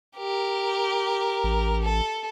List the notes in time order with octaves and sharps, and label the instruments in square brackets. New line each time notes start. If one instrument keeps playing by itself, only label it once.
[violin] G4 A#4
[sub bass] A1
[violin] A4